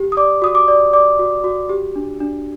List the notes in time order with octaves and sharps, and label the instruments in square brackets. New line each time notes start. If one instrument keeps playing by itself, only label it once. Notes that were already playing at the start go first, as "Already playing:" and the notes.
Already playing: [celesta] G4
D#6
D5 D6
F#4 D#6
D6
D5
D5 D6
F#4
F#4
G4
D4
D4